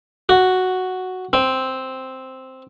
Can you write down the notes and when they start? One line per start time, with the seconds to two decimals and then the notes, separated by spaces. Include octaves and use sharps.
0.29 F#4
1.33 C4